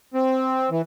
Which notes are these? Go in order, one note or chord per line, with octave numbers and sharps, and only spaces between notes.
C4
E3